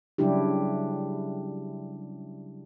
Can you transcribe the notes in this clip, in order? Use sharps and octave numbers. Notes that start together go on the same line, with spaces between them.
C#3 F#3 G3 D4 E4 G4